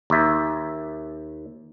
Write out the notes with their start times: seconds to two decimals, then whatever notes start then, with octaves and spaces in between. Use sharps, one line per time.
0.10 D#2 E5